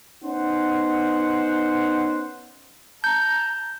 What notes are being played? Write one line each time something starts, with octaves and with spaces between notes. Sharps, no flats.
B3 C#4 D#4 C5 F#5
A5 A#5 G6